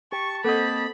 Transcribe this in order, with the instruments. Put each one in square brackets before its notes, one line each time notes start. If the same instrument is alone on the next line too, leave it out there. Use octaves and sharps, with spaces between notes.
[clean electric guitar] G4 [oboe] A5 [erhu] C#6
[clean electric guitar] A#3 C4 D#5 [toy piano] A4 C5 F#5 [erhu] B5